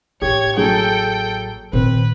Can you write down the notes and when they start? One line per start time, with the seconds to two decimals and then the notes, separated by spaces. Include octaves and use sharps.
0.22 A1 A#3 G4 C#5 G#6
0.57 F#3 G#4 A4 G5
1.73 A#2 D#3 C4 B4